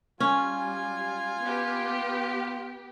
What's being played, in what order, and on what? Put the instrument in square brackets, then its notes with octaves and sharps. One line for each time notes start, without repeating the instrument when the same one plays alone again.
[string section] G3 [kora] C#4 [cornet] F4 [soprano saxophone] G#5
[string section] B3 G4